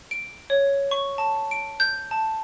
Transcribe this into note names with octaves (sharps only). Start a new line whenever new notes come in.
D7
C#5
C#6
A5
D7
G6
A5